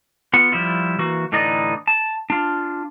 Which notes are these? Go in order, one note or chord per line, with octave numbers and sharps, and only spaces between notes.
B3 F4 F#5
F3 G3 E4 F4
E3 A#3 F#4
A2 D3 E3 D#4 D5 D#5
A5
D4 F4